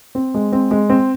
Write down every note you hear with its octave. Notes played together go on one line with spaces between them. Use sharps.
C4
G#3
C4
G#3
C4